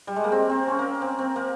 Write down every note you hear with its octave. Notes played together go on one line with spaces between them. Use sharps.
G3
G#3
A#3
C4
C4
C#4
A#3
C4
C4
A#3